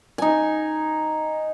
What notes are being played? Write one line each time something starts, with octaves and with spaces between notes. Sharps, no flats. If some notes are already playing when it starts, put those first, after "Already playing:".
D#4 G#5